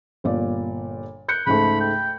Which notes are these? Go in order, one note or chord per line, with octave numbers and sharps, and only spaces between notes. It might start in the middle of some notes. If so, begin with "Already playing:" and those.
G1 A#2 D5
F#6 G6 C#7
C#2 G#2 A3 B5
G5